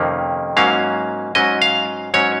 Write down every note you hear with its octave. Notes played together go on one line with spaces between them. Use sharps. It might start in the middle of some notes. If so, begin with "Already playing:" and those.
Already playing: F2 C3 D#3 A#3 C#4
G#2 F#3 A#3 C#4 F5
G#2 F#3 C#4 D#5
F5
G#2 F#3 C#4 C#5